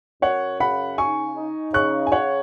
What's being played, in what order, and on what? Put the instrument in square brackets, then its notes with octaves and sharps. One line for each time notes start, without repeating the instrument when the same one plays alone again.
[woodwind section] F#2 [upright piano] C#5 F#5
[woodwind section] C#3 [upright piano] F#5 B5
[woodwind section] D#4 [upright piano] G#5 C#6
[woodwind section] D#4
[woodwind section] C#3 [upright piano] C#6 F#6
[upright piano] G#5
[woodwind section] C#3 [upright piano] C#5 F#5